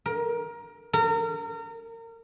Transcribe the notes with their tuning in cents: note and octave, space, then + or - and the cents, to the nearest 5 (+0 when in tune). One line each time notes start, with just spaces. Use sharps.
A#4 +20
A#4 -30